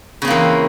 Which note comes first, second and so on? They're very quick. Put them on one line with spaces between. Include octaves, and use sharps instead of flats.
C#3 C4 A#3 E3